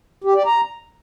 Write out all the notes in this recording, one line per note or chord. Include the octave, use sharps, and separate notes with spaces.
G4
D5
A#5